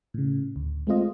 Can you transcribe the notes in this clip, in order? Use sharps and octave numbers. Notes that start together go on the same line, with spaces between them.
A2 C#3
D2
G#3 A3 C4 F4 D#5